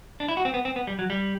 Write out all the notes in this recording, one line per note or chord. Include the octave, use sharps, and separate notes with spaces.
D4
E4
F#4
C4
B3
C4
B3
G3
F#3
G3